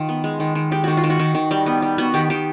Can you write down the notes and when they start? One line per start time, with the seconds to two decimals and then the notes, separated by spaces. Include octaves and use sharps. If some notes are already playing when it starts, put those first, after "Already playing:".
Already playing: D#3 D#4 F4
0.09 B3
0.24 G#3
0.40 D#3
0.55 D#3
0.71 G#3 G4
0.84 D#3 F#4
0.97 F4
1.04 D#3
1.10 F#4
1.19 D#3
1.35 D#3
1.51 G3
1.66 B3
1.82 G3
1.98 B3 F#4
2.14 D#3 G4
2.30 D#3 G4